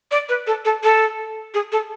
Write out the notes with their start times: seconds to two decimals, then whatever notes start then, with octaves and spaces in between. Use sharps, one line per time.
0.11 D5
0.29 B4
0.47 A4
0.65 A4
0.83 A4
1.54 G#4
1.72 A4